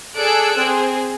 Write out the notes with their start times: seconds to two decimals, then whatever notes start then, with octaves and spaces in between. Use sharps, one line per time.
0.15 G#4 A4 D5 E6 F#6 D7
0.57 C4 G#4